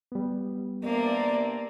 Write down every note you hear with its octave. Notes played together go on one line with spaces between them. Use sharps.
G3 B3
C3 A#3 B3 D4 D5